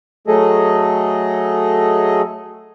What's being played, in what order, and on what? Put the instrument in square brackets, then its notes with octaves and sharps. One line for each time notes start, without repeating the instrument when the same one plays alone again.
[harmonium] F#3 A3 G#4 A4 D#5